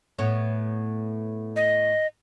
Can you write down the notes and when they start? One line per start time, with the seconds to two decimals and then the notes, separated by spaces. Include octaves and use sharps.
0.18 A2 B3 C#5
1.56 D#5